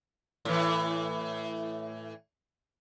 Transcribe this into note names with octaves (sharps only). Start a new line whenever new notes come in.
A2 E3